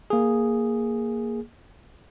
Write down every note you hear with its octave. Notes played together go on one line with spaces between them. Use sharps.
A#3 G#4